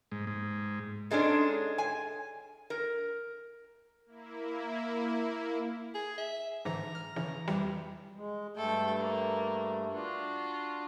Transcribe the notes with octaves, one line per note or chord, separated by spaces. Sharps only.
G#2
G#2
G#2 G#3 C#4 D4 A4
G#5
A#4
A#3 E4
G#4
E5
G#2 D3 E3 A#5
F6
C#3 E3
F2 E3 G3
G#3
G2 A3 A4 G5
A#3
D4 F4 F#4